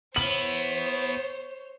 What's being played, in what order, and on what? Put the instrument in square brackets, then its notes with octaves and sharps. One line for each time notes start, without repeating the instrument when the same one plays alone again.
[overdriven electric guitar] B3 E4 [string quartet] C5 C#5 [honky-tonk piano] F#7